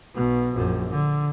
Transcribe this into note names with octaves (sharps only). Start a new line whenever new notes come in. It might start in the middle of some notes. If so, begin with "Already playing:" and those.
B1 B2
A#1 F#2
D3